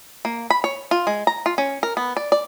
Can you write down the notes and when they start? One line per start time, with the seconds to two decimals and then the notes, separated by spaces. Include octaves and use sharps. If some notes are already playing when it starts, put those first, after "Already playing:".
0.25 A#3
0.50 B5
0.64 C#5
0.91 F4
1.07 G#3
1.27 A#5
1.46 F4
1.58 C#4
1.83 A#4
1.97 B3
2.17 D5
2.32 D5